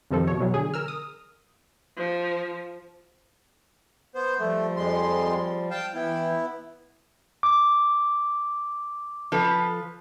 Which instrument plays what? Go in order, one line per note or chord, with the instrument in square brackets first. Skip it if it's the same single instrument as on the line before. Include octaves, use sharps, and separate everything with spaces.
[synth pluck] F2 C3 D#3 F3 A4
B2 C#5
B2 E3 F#3 G3
D3 G#4
A#4 E6 F6
D#6
[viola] F3
[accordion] B3 C5
[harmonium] F3 G3 [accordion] A3
[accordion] F2 G#3 C6
F5 G5 A5
[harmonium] E3 G5 [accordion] B3 E4
[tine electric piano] D6
[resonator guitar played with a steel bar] F3 A4 B4